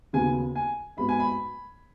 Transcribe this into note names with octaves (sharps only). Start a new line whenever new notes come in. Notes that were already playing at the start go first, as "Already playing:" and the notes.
D#2 C#3 F#3 B3 G#5
G#5
G#2 F#3 B3 B5
G#5
B5